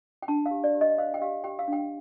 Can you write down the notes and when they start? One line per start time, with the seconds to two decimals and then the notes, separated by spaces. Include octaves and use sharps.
0.23 G5
0.28 D4 A5
0.46 F5
0.51 G4
0.64 D5
0.74 G4
0.81 D#5
0.98 C5 F5
1.14 G5
1.21 G4 F5
1.44 G4 G5
1.59 F5
1.68 D4 G5